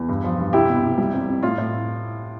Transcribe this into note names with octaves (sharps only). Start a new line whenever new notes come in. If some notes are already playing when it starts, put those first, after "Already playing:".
Already playing: E2
G2
F3
G2
C2 E4 G4
B2
C2
G3
F2
F2
A2 F4
A2